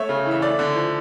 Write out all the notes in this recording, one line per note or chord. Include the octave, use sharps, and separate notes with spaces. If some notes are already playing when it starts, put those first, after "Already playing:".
Already playing: A3 C#5 E5
C#3
E3
E5
A3 D5
D3
F3